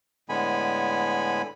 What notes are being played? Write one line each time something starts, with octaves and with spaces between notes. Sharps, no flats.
A2 D3 G#3 B3 G#5 B5